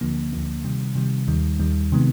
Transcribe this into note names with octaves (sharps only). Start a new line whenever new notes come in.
D2 D3 F3 A#3
D2 D3 F3 A#3
C3 D#3 G3
C3 D#3 G3
D#2 D#3 G3
D#2 D#3 G3
C3 D#3 G#3 B3